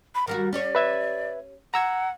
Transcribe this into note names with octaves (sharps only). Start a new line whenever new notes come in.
B5
D#3 G3 F#4 A#4
C#4 G4 C#5 D5
B4 E5 G#6
F#5 A#5 E6 G#6